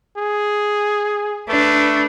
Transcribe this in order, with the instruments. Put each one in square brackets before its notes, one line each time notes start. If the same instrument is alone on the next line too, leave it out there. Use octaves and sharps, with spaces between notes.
[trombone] G#4
[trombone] A3 [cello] D4 B4